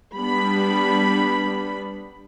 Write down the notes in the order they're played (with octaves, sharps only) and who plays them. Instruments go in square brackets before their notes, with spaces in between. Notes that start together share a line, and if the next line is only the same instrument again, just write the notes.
[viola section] G3 B3 D4 B5